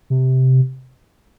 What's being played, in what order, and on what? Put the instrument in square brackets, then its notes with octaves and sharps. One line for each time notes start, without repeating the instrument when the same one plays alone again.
[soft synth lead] C3